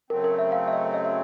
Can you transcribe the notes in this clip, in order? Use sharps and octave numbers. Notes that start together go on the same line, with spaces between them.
F#2 C#3 F#3 A3 C4 A#4
A#4
E5
F5
E5
D#5
D#5
E5